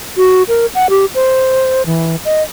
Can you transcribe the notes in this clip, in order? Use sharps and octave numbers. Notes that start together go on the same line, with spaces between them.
F#4
A#4
F#5
G4
C5
E3
D#5